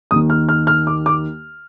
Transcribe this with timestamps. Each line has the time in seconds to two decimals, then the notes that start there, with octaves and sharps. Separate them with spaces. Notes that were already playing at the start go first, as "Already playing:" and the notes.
0.11 D#2 D#3 D#6
0.30 F6
0.49 F6
0.67 F6
0.87 D6
1.06 D6